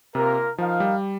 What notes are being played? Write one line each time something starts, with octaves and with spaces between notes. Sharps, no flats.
C3 A#3 F4 A#4
F3 D#4 A#4 F5
G3